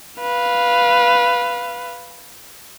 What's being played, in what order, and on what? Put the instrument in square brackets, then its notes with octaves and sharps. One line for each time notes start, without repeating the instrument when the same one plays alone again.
[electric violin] B4 F5